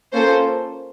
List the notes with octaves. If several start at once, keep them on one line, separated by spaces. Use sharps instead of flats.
A#3 C#4 F4 A4 C5